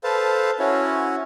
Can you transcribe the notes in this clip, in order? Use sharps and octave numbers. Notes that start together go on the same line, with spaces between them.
A4 B4 C5 F5 A5
C#4 E4 F#4 C#5